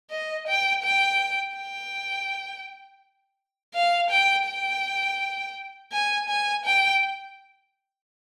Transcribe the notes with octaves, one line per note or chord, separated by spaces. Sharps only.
D#5
G5
G5
G5
F5
G5
G5
G#5
G#5
G5